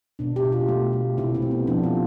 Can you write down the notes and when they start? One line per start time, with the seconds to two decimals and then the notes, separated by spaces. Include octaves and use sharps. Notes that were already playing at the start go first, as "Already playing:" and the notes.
0.19 B2 D4
0.36 G4
0.44 B2
0.52 F4
0.68 A3
0.93 A3
1.18 C3 E4
1.35 C4
1.42 A3
1.51 B3
1.67 F3 D4
1.84 F4